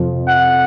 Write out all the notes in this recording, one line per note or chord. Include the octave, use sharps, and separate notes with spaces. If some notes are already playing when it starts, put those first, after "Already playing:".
Already playing: F2 C3 F3
F#5